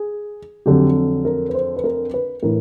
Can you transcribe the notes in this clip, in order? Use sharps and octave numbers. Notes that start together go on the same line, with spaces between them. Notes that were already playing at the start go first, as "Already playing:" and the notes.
Already playing: G#4
F2 D3 F#3 G4
A#4
B4
C5
B4
A#4
B4
A2 E3 A#4